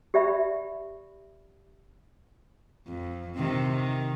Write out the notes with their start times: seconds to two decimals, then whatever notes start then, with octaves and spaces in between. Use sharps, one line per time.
0.14 G4 D5 E5 B5
2.87 F2
3.36 C3 D#3 C4
3.71 D#3